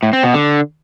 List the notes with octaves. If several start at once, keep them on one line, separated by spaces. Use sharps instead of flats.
A2
C4
B2
D3